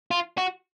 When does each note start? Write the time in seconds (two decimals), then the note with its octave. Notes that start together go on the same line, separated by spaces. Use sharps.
0.11 F4
0.38 F#4